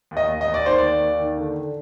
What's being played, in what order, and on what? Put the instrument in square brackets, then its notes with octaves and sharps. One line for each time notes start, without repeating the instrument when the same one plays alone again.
[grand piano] D#2
D#5
D#2
D#5
D#2
D5
D#3 C5
D#2 D5
D#2
D#3
D3
D3